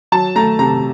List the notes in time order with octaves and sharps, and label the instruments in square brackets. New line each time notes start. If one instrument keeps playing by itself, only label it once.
[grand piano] F#3 A5
A3 A#5
C3 A#5